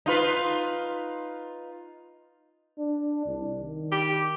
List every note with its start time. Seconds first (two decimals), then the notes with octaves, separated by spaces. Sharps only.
0.06 D#4 F4 B4
2.78 D4
3.26 C2
3.61 D#3
3.92 G4